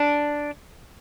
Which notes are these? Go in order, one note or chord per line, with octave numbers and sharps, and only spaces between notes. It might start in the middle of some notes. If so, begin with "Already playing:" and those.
Already playing: D4